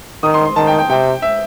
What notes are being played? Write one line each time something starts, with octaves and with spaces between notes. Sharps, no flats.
D#3 D#6
C6
C6
D#3 A5
G5
G5
C3 G5
E5